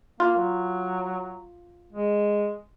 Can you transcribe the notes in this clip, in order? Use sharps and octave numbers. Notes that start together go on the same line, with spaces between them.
A#3 F4
F#3
G#3